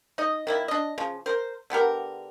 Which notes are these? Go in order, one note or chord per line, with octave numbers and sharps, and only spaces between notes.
D#4 D#5
D#3 A#3 E4
D4 D#5
C#3 F3
A#4 C5
D3 B3 G4 A#4